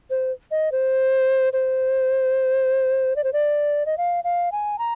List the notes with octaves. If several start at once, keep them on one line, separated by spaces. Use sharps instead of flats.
C5
D#5
C5
C5
D5
C5
D5
D#5
F5
F5
G#5
A#5